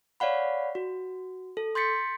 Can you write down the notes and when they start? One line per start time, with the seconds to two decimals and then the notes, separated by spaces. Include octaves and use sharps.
0.20 C#5 D5 F5 F#5 B5
0.75 F#4
1.57 A4
1.75 C6 G6 A6 B6 C#7